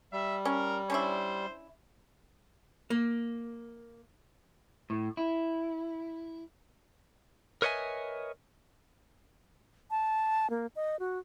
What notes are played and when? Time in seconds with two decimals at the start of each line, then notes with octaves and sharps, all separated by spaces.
0.12 G3 E5
0.45 C#4 A#4
0.90 C#4 D4 E4 C5
2.90 A#3
4.90 A2
5.17 E4
7.62 A#4 B4 C#5 D#5 E5 G#5
9.91 A5
10.50 A#3
10.76 D#5
10.99 F#4